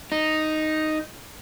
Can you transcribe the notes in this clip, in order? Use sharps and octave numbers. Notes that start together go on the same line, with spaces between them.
D#4